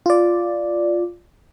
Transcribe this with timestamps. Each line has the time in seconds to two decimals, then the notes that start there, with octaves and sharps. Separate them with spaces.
0.06 F4 D5